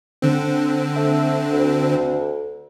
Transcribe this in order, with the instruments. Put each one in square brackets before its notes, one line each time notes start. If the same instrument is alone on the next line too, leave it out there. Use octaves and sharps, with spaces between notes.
[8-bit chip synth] D3 C4
[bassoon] A3
D2